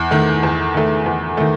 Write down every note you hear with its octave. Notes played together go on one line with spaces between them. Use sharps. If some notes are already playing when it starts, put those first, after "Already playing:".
Already playing: E2
D#3 A3
E2
D#3 A3
E2
D#3 A3